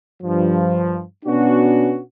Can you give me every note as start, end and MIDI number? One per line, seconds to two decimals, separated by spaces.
0.22 1.02 43
0.22 1.02 53
1.25 2.00 47
1.25 2.00 59
1.25 2.00 61
1.25 2.00 62
1.25 2.00 66